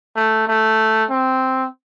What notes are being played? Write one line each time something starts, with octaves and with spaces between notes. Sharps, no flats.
A3
A3
C4